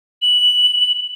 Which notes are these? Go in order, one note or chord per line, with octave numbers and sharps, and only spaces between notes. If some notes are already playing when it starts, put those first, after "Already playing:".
F#7